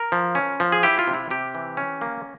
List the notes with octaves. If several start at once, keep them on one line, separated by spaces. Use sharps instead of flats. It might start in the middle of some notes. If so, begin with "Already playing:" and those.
Already playing: A#4
F3
C#4
F3
G#4
E4 G4
F4
C3
E4
C3 G4
E3
C#4
A#3